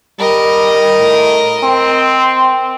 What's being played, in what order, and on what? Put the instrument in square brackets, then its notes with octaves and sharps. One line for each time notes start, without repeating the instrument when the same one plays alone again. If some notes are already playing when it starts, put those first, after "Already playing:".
[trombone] G3 [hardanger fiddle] A#4 D#5
[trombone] A2
C4